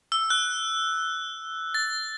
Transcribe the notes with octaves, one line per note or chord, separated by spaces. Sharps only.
E6
F#6
A6